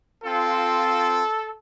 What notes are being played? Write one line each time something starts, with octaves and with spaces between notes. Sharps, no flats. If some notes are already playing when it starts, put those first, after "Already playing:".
C4 F4 A4